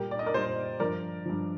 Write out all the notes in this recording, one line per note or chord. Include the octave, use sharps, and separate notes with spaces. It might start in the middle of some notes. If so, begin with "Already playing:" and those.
Already playing: A#2 G3 G4 A#4
D5
D#5
A#4 D5
A#2 G3 C5 D#5
G2 F3 A#4 D5
G2 F3